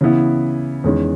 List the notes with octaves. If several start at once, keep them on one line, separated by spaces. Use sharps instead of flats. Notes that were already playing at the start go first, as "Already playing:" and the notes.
C#3 E3 B3 E4
E2 D#3 G#3 C#4